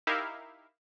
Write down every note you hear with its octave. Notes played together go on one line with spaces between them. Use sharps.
D#4 E4 G4 A#4 E5 F5